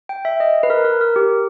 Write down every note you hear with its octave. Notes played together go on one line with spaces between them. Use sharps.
G5
E5
D#5
B4
A#4
A#4
A#4
G4